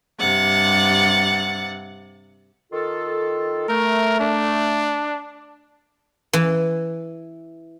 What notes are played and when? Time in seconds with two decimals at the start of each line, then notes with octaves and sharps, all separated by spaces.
0.19 G2 C3 F#5 A6
2.73 D#3 F4 A4
3.69 A3 A#4
4.20 D4
6.33 E3